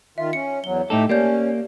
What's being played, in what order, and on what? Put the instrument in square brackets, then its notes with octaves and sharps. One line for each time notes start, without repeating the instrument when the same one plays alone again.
[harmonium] D#3 F4 [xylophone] E5
[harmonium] C#4 [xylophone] C#7
[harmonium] E2 F#3 [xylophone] G7
[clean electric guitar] A2 D#4 A4 [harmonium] A3 G4
[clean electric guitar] A#3 [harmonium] C#4 [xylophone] G4 D5 G6